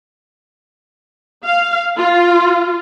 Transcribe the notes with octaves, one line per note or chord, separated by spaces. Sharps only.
F5
F4